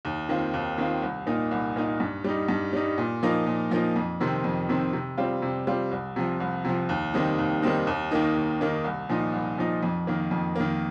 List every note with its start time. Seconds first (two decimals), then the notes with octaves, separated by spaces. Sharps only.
0.05 D#2
0.29 D#3 C4 F4
0.54 D#2
0.78 D#3 C4 F4
1.02 C2
1.26 A#2 A#3 D#4
1.51 C2
1.76 A#2 A#3 D#4
2.00 G2
2.24 G3 D#4
2.48 G2
2.73 G3 D#4
2.98 A#2
3.23 F3 A#3 D#4
3.46 A#2
3.71 F3 A#3 D#4
3.96 F2
4.20 C3 D#3 C4
4.44 F2
4.69 C3 D#3 C4
4.93 C3
5.18 G3 C4 F4
5.42 C3
5.67 G3 C4 F4
5.91 C2
6.16 C3 F3
6.40 C2
6.65 C3 F3
6.89 D#2
7.14 D#3 G3 C4 D#4
7.39 D#2
7.62 D#3 G3 C4 D#4
7.87 D#2
8.11 D#3 A#3 D#4
8.36 D#2
8.60 D#3 A#3 D#4
8.84 C2
9.09 A#2 F3 D#4
9.33 C2
9.58 A#2 F3 D#4
9.83 F2
10.07 D#3 A#3
10.31 F2
10.55 D#3 A#3